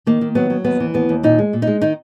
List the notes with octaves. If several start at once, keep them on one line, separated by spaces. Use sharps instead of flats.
D#3 A#3
D#3
F#3 B3
F#3
D#2 B3
E3
D#2 B3
D#2
A#2 D#4
G#3
A#2
D#4
G#3
D#3 D#4